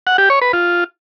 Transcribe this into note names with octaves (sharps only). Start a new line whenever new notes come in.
F#5
G4
C#5
B4
F4